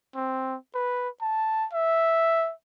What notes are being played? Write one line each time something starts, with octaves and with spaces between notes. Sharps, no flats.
C4
B4
A5
E5